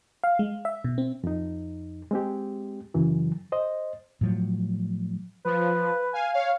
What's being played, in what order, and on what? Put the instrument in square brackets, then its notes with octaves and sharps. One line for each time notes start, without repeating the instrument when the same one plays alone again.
[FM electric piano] F5
G#3
E5
B2
C4
[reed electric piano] F2 D#4
G#3 C4 G4
F#2 C#3 E3 F#3
C5 D#5
[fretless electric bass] A2 F3 F#3
[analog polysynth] F3 [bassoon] B4
[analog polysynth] F5 G#5
C#5 F5